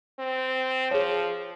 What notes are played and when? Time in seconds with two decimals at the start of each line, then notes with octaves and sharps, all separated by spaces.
0.19 C4
0.91 F3 G#4 C#5